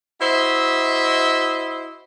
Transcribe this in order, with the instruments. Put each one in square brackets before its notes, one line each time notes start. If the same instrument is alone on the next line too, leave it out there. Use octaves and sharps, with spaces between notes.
[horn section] E4 F#4 C5 D#5 E5